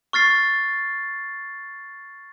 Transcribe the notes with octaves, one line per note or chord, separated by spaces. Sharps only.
C#6 F6 A6 C7